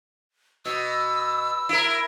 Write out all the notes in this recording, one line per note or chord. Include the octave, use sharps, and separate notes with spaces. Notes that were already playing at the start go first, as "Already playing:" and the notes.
B2 E6
E4 A#4